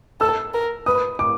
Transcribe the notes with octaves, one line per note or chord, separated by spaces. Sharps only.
A4 E6
A#4
B4 D#6
D6